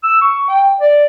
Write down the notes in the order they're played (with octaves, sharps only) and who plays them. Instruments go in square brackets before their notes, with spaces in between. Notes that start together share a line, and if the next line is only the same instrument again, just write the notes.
[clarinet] E6
C#6
G5
D5